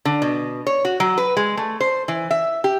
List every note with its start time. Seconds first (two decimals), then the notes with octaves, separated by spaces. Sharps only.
0.05 D3
0.22 B2
0.67 C#5
0.85 F#4
1.00 F#3
1.18 B4
1.37 G#3
1.57 A3
1.80 C5
2.08 E3
2.31 E5
2.64 G4